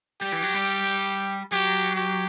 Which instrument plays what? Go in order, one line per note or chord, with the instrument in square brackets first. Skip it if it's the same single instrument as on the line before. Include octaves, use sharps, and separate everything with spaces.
[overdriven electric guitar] G3 [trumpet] G4
[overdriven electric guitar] E3
F#3
G3
[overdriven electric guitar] F#3 [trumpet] G4
[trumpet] G4